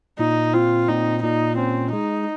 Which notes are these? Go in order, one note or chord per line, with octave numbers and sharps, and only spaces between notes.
A#2 D#4
C4 F4
A#2 D#4
A#2 D#4
C4 C#4
G#3 D#4